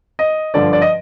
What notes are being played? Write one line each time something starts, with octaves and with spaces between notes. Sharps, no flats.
D#5
G2 D3 F3 D5
D5
D#5